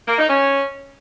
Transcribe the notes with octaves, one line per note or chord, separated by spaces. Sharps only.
A#3
D#4
C#4